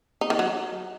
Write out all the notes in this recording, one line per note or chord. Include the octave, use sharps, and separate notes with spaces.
D#4
D#3
F#3